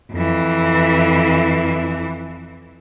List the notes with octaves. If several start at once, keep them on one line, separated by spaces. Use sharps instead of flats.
F2 E3